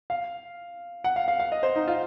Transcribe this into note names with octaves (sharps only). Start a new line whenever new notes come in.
F5
F#5
F5
F5
F5
D#5
C5
D#4
F4